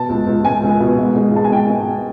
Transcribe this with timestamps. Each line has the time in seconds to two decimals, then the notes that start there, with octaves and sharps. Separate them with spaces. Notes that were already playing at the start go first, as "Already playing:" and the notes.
Already playing: B2 A5
0.09 C#2
0.27 C#2
0.45 C#2 G#5
0.63 C#2
0.80 B2
0.98 G#2
1.16 G#3
1.33 G#2 A5
1.44 G#5
1.52 G#3 G5
1.69 G#2